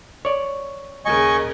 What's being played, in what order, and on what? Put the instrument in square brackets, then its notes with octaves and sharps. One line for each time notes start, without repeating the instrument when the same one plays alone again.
[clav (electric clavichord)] C#5 D5
[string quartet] D#2 C#3 A#4 [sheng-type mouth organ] D#5 G#5 C#6